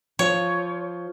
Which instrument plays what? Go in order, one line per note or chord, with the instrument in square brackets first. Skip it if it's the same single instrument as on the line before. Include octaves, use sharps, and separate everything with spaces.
[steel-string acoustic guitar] F3 F4 C5 [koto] C#5